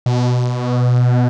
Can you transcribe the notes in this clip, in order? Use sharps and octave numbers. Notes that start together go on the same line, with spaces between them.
B2